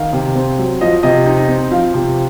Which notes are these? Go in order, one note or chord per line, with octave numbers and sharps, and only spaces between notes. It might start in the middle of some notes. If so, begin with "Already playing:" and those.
Already playing: D#3 F5
C3
C4
F#3
F3 D#5
C3 D#5
D#4
C4
F3 F5
C3